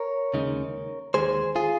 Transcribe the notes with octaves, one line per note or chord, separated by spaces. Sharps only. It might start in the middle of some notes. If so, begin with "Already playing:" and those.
Already playing: A#4 C#5
D#2 C#3 G#3 D#4
D#2 D#3 G#3 G#4 C5
F4 G#4